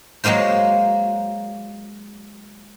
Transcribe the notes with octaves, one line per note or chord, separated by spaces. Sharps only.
F#3 G#3 A#3 F4 C5